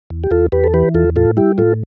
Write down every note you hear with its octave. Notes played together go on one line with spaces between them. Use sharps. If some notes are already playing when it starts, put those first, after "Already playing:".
E2
G4
E2 F4 A4
E2 G4 B4
A4
E3 G4 B4
E2 F4 A4
A2 F4 A4
G3 E4 G4
A2 F4 A4